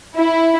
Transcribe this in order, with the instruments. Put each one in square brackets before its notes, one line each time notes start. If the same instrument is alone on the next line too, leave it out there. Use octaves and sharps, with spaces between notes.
[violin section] E4